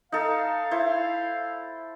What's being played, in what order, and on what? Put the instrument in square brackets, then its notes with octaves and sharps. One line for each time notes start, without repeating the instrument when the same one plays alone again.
[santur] D#4 A4 [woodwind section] F5
[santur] E4 C5